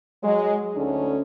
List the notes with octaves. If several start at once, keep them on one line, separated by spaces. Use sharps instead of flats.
F#3 G#3
D2 D3 C#4 D#4 A4